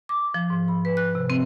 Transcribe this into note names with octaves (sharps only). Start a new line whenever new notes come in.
D6
F3
G#2
B5
B4
F#6
C3
C4